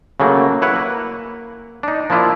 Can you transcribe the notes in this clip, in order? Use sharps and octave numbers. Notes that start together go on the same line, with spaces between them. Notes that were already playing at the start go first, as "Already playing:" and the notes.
C#3 F#3 A3 A#3
E4 B4 C#5 F#5
A#3
D4 D#4
F3 A#3 D4 E4 F4